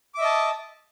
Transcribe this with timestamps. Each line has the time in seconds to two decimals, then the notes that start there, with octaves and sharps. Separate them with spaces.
0.14 D6
0.18 E5
0.21 D#5
0.25 A5